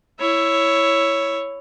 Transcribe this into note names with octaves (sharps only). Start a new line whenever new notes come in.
E4 C#5